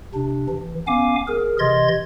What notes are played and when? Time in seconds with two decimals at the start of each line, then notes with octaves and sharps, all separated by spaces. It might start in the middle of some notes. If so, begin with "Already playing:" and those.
0.14 C3 D4
0.49 E3
0.87 B3 C#4 F5 G#5 D6
1.28 G#4 A#4
1.59 C3 E3 D#5 C6 G#6 A6